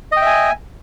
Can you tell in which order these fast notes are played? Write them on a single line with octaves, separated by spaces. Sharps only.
D#5 G5 E5 G#5